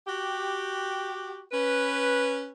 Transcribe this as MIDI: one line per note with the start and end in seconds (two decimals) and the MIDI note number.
0.07 1.43 66
0.07 1.43 67
1.52 2.50 61
1.52 2.50 71